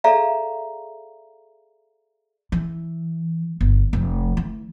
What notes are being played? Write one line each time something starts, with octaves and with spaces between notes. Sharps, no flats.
G#4 A4 D5 E5 F5 A#5
E3
G1
F1
E3